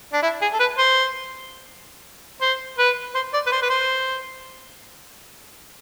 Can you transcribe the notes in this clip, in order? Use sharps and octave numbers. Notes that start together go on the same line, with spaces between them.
D4
E4
G#4
A4
B4
C5
C5
B4
C5
D5
B4
C5
B4
C5